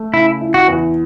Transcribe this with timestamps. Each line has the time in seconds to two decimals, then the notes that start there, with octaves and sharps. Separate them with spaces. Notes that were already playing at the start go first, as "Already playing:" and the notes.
Already playing: A3
0.13 C#3 E4
0.41 E4
0.54 F#4
0.68 E2